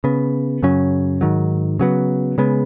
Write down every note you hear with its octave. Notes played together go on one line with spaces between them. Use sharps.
C#3 B3
F#2 C#3 F#3 C#4
G#2 D#3 F#3
C#3 F#3 B3
C#3 G#3 B3